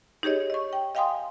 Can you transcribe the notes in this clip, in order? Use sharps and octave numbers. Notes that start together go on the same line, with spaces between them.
D#4 G4 G#4 C#5 D#5
D#5 C#6
G5
D#5 F5 G5 G#5 C6 D#6